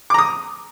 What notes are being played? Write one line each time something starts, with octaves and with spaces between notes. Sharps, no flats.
A#5 D6 D#6